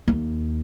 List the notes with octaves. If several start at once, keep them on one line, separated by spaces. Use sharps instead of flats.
D#2